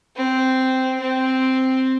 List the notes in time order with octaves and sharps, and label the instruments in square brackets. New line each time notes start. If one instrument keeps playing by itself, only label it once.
[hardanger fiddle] C4
C4